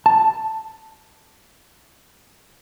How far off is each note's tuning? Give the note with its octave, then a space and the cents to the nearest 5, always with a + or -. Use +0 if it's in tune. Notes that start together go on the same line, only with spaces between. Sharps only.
A5 +5